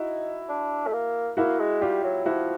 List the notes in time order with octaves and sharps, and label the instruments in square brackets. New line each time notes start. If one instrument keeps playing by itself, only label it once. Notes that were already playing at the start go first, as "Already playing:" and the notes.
Already playing: [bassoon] D#4 [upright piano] E4 F#4
[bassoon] D4
A3
A#3
[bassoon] A#3 [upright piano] E4 F#4
[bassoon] G#3
[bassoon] G3 [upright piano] F4 G4
[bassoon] F#3
[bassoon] F3 [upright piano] E4 F#4